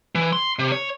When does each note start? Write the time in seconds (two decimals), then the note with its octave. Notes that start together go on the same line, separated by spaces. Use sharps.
0.15 E3
0.33 C6
0.59 C3
0.72 C#5